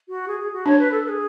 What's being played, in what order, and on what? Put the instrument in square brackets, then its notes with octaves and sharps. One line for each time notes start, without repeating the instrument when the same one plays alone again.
[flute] F#4
G#4
G#4
F#4
[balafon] D4 [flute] C#5
[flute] B4
A4
B4
G#4